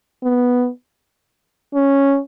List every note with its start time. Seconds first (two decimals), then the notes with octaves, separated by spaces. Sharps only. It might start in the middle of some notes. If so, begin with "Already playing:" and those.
0.23 B3
1.74 C#4